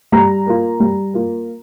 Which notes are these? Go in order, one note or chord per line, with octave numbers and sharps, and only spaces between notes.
G3 A#5
A#3 F4
G3
A#3 F4